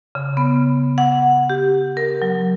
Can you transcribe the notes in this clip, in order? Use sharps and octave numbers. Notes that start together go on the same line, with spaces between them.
C#3
B3
F#5
G4
A#4
F#3